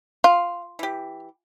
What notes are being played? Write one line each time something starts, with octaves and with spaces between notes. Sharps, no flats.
F4 F5
E3 G4